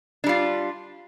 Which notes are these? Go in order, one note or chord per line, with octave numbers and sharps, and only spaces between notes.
G3 D4 F4